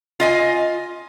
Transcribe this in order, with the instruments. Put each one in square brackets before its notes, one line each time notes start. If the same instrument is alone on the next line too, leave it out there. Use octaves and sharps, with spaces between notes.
[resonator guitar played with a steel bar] F4 D#5 G#5